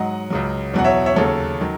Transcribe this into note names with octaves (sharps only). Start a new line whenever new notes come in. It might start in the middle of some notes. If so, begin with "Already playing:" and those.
Already playing: G#2 F#3 D#5 F#5
C#2 C#3 F#3
E2 B2 F#3 F#5
C#5 E5
C#5 E5
D#2 C#3 F#3 A4 C#5
D#3 F#3